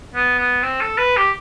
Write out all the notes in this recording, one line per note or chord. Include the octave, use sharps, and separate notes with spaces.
B3
B3
C4
A4
B4
G4